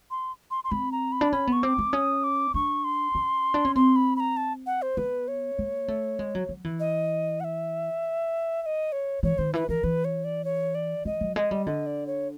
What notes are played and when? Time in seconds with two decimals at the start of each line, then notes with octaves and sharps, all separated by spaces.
0.11 C6
0.51 C6
0.64 C6
0.71 C4 B5
0.92 A#5
1.12 B5
1.21 D4
1.32 C#4 B5
1.47 B3 C#6
1.63 C4 D6
1.78 C4
1.93 C#4 D#6
2.24 D6
2.54 D4 C#6
2.84 C6
3.15 C#4
3.54 D4
3.65 C#4
3.76 C4 C6
3.96 B5
4.16 B5
4.20 A#5
4.37 A5
4.66 F#5
4.82 C5
4.97 B3 B4
5.28 C#5
5.59 A#3
5.88 A3
6.19 G#3
6.35 F#3
6.49 F#3
6.64 E3
6.80 D#5
7.40 F#5
7.44 E5
8.62 E5
8.66 D#5
8.92 C#5
9.23 E3 C#5
9.38 D#3 C5
9.54 E3 B4
9.69 E3 A#4
9.83 E3 B4
10.05 C#5
10.24 D5
10.45 C#5
10.75 D5
11.05 F#3 D#5
11.21 F#3
11.36 G#3 D#5
11.51 G3
11.66 D3 D#5
11.86 D5
12.07 C#5